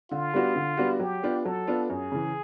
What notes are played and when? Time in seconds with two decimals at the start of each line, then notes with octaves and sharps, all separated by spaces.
0.11 D3 F4
0.34 G3 B3 D4 F#4
0.56 D3
0.77 G3 B3 D4 F#4
1.00 F#3 G4
1.23 B3 D4 F4
1.45 F#3 A4
1.67 B3 D4 F4
1.89 F#2 G#4
2.12 C#3 E3